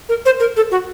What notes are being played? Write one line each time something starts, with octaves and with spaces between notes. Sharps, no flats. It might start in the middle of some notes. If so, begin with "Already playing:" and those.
A#4
C5
A#4
A4
F#4